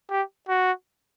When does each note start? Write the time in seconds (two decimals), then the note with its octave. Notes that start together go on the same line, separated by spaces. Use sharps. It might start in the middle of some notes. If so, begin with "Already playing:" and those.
0.10 G4
0.49 F#4